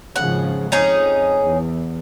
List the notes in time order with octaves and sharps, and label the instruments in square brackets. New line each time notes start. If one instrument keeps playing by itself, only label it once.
[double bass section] G#1 C#3 F3 [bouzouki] F#5
[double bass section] F2 [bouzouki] C#4 D#4 G#4
[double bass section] E2